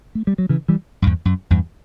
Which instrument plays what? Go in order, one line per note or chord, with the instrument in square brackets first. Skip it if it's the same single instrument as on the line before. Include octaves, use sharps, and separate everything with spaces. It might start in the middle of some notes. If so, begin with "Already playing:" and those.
[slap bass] A3
G3
F#3
C#3 E3
E3 G3
F#2
E2 G2
F#2
E2 G2